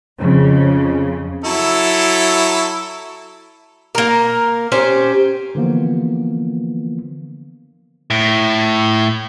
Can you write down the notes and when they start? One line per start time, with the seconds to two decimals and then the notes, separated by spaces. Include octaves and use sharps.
0.19 F2 C#3
1.44 F#3 E4 A4
3.95 A#3 A#4
4.72 C#4 G4 C5
5.55 D3 E3 F3 A#3 B3
8.10 A2